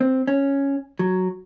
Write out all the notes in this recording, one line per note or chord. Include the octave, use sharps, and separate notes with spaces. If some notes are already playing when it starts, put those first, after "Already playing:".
C4
C#4
F#3